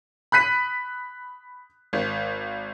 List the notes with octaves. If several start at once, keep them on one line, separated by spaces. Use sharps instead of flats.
B5 F#6 B6 D#7
G#1